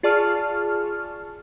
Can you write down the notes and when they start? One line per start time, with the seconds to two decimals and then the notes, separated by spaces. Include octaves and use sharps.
0.03 F4 G#4 D5 A5 C#6 F6